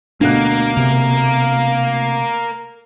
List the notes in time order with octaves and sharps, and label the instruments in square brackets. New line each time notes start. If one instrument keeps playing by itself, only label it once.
[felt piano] D2 B2 F#6 [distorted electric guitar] A#3 [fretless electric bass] D4
[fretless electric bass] C3